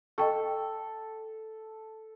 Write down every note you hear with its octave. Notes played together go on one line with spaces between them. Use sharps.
A4 D#5 G5 C#6